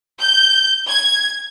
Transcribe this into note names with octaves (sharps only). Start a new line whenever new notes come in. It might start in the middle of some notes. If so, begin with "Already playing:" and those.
G6
G#6